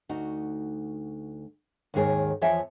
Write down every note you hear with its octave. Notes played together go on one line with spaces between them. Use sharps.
D2 D#4 F#4
D#2 G#2 D#3 G#4 C#5
E2 F3 C#5 E5 G#5